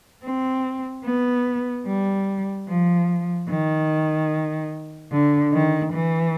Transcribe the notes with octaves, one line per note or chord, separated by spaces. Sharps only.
C4
B3
G3
F3
D#3
D3
D#3
E3